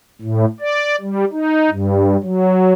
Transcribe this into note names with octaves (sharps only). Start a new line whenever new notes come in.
A2
D5
G3
D#4
G2
F#3